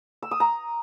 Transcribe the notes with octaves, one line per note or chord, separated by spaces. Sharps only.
E6
D#6
A#5